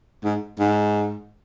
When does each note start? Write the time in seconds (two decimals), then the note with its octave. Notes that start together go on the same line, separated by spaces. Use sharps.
0.24 G#2
0.59 G#2